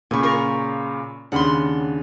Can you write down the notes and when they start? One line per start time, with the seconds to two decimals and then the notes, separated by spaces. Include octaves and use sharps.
0.11 A#2 C#3 G#5 B5 C#6
0.23 F4 A#4 C#6
1.32 D#2 C#3 D4 F#5 B5 C6